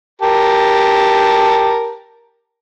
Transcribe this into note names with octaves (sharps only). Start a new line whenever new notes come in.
G4 A#4 A5